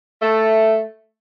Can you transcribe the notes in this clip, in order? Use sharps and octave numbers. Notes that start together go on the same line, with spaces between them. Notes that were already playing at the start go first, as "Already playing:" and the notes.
A3